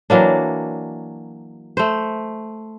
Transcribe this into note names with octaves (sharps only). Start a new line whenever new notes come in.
E3 F#3 A#3 D4
A3 C5